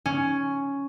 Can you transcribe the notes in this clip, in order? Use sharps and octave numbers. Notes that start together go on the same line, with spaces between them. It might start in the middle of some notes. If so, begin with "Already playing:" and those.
C#4